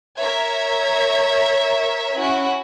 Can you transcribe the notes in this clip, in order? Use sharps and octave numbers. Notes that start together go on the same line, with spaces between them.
A#4 C#5 E5 A#5 G#6
C#4 E4 F#4